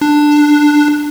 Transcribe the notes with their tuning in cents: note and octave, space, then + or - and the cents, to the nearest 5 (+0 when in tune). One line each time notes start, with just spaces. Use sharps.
D4 +10